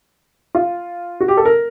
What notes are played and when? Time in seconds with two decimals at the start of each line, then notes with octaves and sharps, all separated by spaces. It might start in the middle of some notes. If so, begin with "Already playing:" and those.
0.55 F4
1.20 F#4
1.28 G4
1.37 A4
1.45 A#4